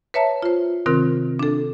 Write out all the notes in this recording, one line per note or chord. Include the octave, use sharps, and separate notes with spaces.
B4 C#5 E5 A5 A#5
F4 C5
C3 D#3 C4 F4 A#4
D4 A4